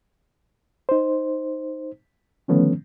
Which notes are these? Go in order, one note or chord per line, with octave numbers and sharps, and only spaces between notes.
D#4 C5
D3 D#3 F3 A3 B3 C#4